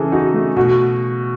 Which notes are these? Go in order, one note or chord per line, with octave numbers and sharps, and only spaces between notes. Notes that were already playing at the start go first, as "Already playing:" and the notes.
Already playing: C#3 E3 G#4 A4
D#4 F#4
A3
B2 F#4